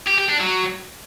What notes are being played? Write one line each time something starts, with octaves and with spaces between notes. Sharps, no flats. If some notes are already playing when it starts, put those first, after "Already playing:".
G4
G4
D4
F#3